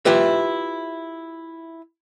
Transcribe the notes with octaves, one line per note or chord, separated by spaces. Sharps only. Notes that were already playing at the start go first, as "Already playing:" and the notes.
E4 F4 G4 B4 E5